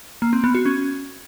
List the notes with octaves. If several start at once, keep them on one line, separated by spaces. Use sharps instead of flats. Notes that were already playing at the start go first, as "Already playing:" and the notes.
A#3
C4
B3
F#4
C#4